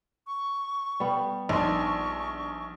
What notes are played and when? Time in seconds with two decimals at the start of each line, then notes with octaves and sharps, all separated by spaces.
0.27 C#6
1.00 G3 B3
1.49 A#1 D4 D#4 C6 C#6